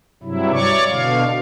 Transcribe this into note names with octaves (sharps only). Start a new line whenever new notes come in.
G2 C3 F#3 E4
C#5 D5 C#6 D6
B2 D3 F5